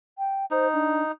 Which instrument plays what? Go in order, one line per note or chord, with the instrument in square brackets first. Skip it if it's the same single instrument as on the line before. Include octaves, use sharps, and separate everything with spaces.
[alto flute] G5
[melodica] D#4 [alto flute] C5
[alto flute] D4